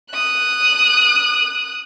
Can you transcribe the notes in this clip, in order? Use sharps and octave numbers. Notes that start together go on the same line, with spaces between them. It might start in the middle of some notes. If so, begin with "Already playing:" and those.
D#6 F#6